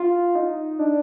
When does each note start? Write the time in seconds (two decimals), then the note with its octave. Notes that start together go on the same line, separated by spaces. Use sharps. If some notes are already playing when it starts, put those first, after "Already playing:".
Already playing: F4
0.35 D#4
0.79 D4